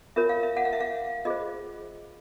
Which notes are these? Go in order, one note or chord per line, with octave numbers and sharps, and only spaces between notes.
F4 A#4 C#5 E5
F5
E5
F#5
F5
E5
F5
F4 G#4 C5 D#5